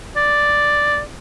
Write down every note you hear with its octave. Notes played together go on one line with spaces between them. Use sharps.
D5